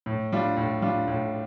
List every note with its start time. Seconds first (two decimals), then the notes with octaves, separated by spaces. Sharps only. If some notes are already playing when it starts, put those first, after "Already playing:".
0.06 A2
0.32 G3 D4 F4
0.57 A2
0.82 G3 D4 F4
1.08 A2